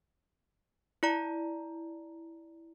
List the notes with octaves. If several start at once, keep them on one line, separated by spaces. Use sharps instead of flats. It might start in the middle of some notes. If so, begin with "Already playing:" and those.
E4 D5 A#5